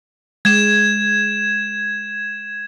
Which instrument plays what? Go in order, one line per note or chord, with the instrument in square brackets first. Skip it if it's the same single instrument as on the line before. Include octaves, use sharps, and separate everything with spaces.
[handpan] G#3 [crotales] G#6 E7